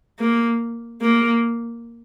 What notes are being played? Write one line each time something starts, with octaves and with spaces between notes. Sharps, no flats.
A#3
A#3